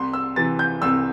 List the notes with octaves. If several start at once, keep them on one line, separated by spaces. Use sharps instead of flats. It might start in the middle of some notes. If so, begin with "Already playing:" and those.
Already playing: C2 C6
E6
C3 E3 A6
G6
C2 E6